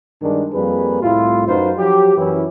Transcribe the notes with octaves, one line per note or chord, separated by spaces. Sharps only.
G2 D#3 G#3 D4
F2 G3 A#3 G#4 B4
C2 A2 E4 F4
F#2 D#4 F4 B4 C5
F3 F#3 G4
F#2 E3 C#4 E4